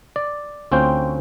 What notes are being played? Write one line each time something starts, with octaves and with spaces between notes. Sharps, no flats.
D5
D2 C4 C#4 F4 C5 G5